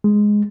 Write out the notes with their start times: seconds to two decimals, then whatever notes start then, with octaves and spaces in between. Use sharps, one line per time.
0.04 G#3